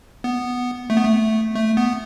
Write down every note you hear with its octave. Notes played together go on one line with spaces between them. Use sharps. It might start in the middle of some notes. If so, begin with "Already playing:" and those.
B3
A3
B3
A3
A3
B3